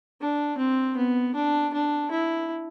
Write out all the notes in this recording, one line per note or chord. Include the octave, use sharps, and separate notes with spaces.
D4
C4
B3
D4
D4
E4